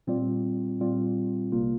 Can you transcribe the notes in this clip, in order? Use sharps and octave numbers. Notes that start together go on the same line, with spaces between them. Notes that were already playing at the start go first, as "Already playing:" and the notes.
A#2 G3 C4 F4 D5
A#2 G3 C4 F4 D5
C2 C3 A#3 F4